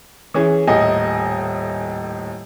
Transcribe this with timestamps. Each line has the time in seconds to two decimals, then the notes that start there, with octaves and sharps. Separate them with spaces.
0.34 E3 C#4 G#4
0.67 D#1 A2 D#5 G#5